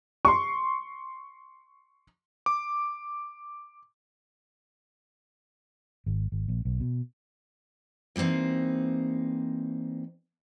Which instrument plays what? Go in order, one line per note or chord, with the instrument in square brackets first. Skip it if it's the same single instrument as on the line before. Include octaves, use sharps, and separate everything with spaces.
[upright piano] C6 C#6
[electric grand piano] D6
[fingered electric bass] G#1
G#1
A#1
B1
B2
[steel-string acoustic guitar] E3 G3 A#3 C4 D#4